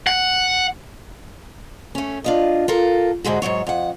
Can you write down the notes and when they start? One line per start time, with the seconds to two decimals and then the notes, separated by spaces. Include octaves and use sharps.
0.07 F#5
1.95 A3 C#4
2.24 D4 F4 D#5
2.68 F4 A4 A#4
3.24 G#2 D3 G#3 F#4
3.42 G#2 D#3 F#3 C#5
3.67 F2 F#5